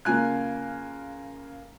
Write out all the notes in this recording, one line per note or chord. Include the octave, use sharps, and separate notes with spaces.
C#3 A#3 F4 G#5 F#6